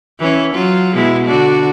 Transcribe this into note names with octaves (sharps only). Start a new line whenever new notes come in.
E3 C#4
F#3 F4
B2 G#3 E4
D3 D4 F#4